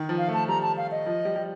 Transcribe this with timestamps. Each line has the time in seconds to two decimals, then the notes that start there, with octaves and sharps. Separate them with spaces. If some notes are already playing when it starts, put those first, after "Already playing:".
Already playing: D#3
0.09 F3
0.18 F5
0.28 A3
0.34 A5
0.48 G3 A#5
0.62 A5
0.77 F5
0.91 D#5
1.06 F3
1.25 G3
1.36 G3